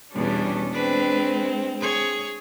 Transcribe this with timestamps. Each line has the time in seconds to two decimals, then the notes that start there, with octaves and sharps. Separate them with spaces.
0.13 E2 B2 G3 C#4 D4
0.71 G#3 C4 D4 B4
1.80 G#4 C#5